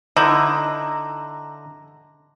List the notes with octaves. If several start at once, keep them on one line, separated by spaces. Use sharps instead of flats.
D3 D#4 E4 A#5